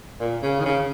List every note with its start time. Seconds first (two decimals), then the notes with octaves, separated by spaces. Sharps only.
0.20 A#2
0.43 C#3
0.60 D#3
0.65 C#3